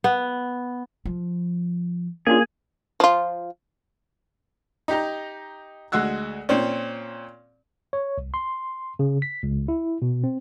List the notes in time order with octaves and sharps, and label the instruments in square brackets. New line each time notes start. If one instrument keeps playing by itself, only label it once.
[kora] B3
[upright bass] F3
[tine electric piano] A#3 [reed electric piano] C#4 D4 F4 [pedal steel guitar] G#4
[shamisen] F3 F4
[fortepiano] D#4 G4 A#5
D2 G#3 F#4 E6 F#6
A#2 C4 C#4
[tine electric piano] C#5
C2
C6
C#3
B6
C#2
E4
B2
C4